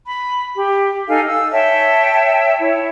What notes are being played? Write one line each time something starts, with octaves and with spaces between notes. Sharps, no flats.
B5
G4
D#4 A4 F5 G#5
E6
C#5 E5 G5 A5
E4 C#5